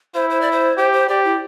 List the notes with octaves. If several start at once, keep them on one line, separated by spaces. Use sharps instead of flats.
E4 C5
C5
D5
C5
G4 C5
C5
G4 D5
E4